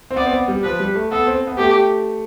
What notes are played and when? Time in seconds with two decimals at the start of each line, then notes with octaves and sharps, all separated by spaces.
0.11 C4
0.16 B3 D5
0.26 C4
0.33 B3
0.48 G3
0.64 F3 B4
0.80 G3
0.95 A3
1.12 B3 A4
1.27 C4
1.47 B3
1.58 A3 G4